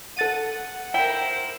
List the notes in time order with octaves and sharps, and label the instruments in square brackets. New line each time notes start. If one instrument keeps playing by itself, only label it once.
[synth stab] A4 A6 D#7 [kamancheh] F#5
[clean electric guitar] E4 [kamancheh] A#4 C5 [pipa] G5